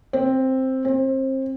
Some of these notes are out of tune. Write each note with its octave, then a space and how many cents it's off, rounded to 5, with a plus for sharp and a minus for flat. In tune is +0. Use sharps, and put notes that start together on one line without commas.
C4 +5
C4 +30